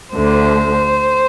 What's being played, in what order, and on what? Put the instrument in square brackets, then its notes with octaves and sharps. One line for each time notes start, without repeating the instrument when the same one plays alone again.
[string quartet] D2 D3 C5